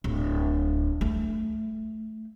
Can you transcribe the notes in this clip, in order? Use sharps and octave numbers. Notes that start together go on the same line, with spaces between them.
D1
A3